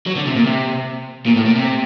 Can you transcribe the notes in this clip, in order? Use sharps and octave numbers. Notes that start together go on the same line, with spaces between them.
F#3
D3
C3
A#2
C3
A#2
A2
A#2
C3